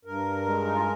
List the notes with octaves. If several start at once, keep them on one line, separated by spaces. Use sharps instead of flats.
G2 A#4
G#3
D#4
F4